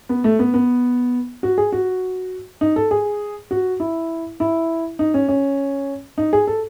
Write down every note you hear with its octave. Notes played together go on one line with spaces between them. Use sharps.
B3
A3
B3
B3
F#4
G#4
F#4
D#4
A4
G#4
F#4
E4
E4
D#4
C#4
C#4
D#4
G#4
A4